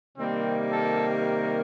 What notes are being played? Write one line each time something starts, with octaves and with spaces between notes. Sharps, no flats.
C3 D#3 G3 A#3 C4
A4
A#4